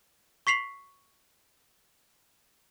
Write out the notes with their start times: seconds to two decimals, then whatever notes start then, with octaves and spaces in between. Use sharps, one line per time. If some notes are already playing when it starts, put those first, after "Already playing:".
0.47 C#6 B6 C7 F7 F#7